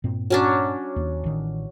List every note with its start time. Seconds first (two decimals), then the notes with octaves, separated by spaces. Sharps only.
0.04 G2 A#2 C4
0.30 F#3 C#4 D4
0.96 D#2
1.24 A1 D#3